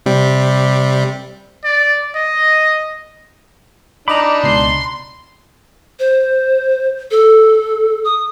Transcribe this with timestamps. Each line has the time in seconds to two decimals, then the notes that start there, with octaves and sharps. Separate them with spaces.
0.06 C3 G3
1.64 D5
2.15 D#5
4.08 D4 D#4 D#5 A#5 B5 D6
4.44 C#2 B2 C6 C7
5.99 C5
7.11 A4
8.05 D#6